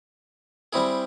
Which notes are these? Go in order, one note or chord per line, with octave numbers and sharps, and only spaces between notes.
G3 C4 E4 G#4